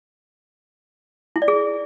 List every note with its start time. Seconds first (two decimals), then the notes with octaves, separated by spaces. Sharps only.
1.36 E4
1.42 D5
1.48 G#4